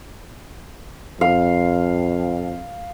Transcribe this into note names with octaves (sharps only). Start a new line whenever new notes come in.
F2 F5